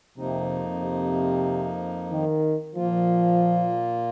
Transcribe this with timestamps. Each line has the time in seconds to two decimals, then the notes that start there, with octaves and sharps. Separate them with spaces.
0.17 F2 C3 F3 A#3 D#4
0.82 C3
2.11 D#3
2.76 A#2 F3 A#3 F4